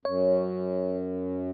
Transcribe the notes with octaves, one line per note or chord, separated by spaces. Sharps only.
F#2 C#5